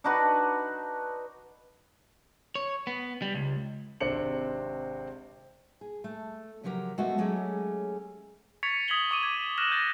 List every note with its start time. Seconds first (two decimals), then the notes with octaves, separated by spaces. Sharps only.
0.04 D4 D#4 F#4 B4
2.55 C#5
2.87 B3
3.22 G3
3.34 C#2
4.00 G#1 C3 C4 D4 C#7 F#7
5.81 G#4
6.04 A3
6.63 C#3 F3 F#3 G4 A#4
6.98 G#3 A3 B3 F#4 D#5 E5
7.18 F#3 G#3 A3 C#4 G4 G#4
8.63 C#6 G#6 A6 B6 C#7 F7
8.88 D#6 G#6 B6 C#7 F#7 G7
9.11 C#6 D6 D#7
9.23 C#6 D6 G#6
9.58 F6 F#6 A#6 E7 F#7
9.72 G6 A6 A#6